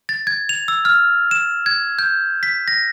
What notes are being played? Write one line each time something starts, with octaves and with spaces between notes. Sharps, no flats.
A6
G#6
F7
E6
F6
E7
G#6
G6
B6
A#6